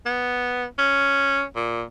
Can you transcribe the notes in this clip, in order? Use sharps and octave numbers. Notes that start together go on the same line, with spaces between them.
B3
C#4
A#2